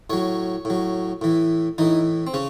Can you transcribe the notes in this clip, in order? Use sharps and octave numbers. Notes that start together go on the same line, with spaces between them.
A2 F#3 C#5
A2 F#3
A2 E3
A2 E3 D#4
C4
C#3 C#4